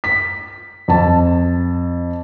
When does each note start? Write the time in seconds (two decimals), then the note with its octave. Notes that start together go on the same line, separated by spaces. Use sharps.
0.04 B6
0.88 F2 A5